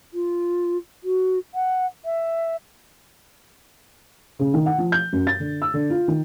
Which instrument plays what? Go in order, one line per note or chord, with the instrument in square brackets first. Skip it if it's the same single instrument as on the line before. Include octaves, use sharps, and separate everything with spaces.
[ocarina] F4
F#4
F#5
E5
[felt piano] C#3
D#3
F#5
F3
G6
F#2
A6
D3
E6
D3
F4
D#3